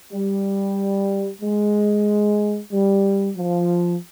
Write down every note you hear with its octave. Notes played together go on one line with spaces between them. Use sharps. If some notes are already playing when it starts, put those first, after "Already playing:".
G3
G#3
G3
F3